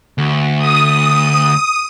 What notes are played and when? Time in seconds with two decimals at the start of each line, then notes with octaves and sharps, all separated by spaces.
0.18 D2
0.58 D#6